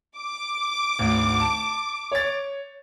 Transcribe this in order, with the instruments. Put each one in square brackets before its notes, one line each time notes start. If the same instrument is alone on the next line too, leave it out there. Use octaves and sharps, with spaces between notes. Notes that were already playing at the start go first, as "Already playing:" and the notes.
[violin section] D6
[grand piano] G#1 D2
A5
C#5 A6